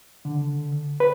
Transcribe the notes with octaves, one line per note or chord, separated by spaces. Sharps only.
D3
B4